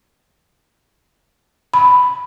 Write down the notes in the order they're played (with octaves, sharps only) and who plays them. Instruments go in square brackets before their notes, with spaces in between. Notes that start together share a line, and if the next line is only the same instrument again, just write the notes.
[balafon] B5